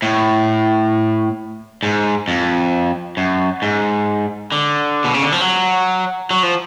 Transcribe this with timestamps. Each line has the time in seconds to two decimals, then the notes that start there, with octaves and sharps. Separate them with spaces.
0.02 A2
1.83 G#2
2.28 F2
3.17 F#2
3.62 G#2
4.52 D3
5.04 B2
5.14 C#3
5.22 D3
5.32 F3
5.41 F#3
6.31 F#3
6.43 F3